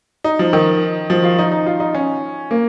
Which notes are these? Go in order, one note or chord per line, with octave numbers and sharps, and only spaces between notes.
D#4
F3
D#3
F3
F4
D#4
D#4
F4
D#4
C#4
A#3